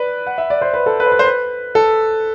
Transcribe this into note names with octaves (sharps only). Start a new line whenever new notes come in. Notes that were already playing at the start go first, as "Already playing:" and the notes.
Already playing: B4 D5
F#5
E5
D5
C5
B4
A4
B4
C5
B4
C5
B4
A4